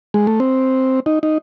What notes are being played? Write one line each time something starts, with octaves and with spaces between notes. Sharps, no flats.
G#3
A3
C4
D#4
D#4